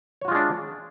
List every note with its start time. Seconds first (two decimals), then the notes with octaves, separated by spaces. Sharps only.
0.21 C#5
0.25 F#4
0.28 F4
0.31 G#3
0.35 D4